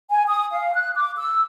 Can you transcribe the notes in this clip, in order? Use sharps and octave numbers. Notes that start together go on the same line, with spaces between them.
G#5
D#6
F5
F#6
D6
E6